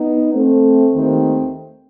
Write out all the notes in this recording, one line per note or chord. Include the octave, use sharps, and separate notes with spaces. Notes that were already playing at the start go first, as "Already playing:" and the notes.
Already playing: B3 D#4
A3 C4
D#2 D#3 A3 C4